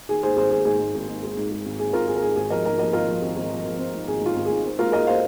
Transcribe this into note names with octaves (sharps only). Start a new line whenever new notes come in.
D#3 G#4
G#2 G#4 C5
G#1 G#4 C5
G#1 G#4
G#2 G#4
G#2
G#1
G#2
G#3
G#2
G#3
G#1
D#3 G#4
G#1 F4 A#4
G#1 G#4
A#4
G#2 G#4
G#1 G#4
F3 A#4 D#5
G#2 A#4 D#5
F3 A#4 D#5
G#1 F4 A#4
F3
G#1
G#1
F3
F3
C4
G#2
G#1 G#4
G#2 F4
G#1
G#2 G#4
C4
G#3 F4 A#4
G#2 A#4 D#5
C5 F5